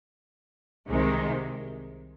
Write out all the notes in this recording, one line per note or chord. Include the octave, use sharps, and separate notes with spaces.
C2 C3 D#3 G#3